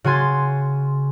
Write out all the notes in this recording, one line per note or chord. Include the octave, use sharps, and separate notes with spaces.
C#3 F#4 G#5 C6 A6